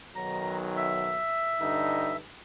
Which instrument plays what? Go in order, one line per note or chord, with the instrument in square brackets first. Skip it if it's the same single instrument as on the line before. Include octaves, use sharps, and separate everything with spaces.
[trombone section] B1 D#3 F#3 [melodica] A#5
[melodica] E5
[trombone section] G2 D3 D#4